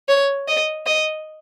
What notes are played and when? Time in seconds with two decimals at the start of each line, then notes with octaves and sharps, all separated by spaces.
0.08 C#5
0.48 D#5
0.86 D#5